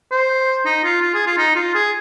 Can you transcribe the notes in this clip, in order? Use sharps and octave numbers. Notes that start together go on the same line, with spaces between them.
C5
D#4
F4
F4
G#4
F4
D#4
F4
G#4